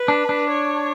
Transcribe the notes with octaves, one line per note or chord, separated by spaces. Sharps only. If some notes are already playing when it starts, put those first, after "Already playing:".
Already playing: B4
D4
D4
C#5